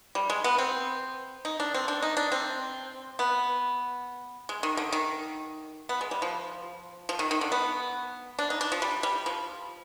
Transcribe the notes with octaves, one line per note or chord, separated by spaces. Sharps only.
G3
G#3
B3
C4
D#4
D4
C4
D4
D#4
D4
C4
B3
G#3
D#3
D3
D#3
B3
G#3
G3
F3
F3
D#3
D#3
D3
B3
D4
D#4
D4
F3
G3
G3
F3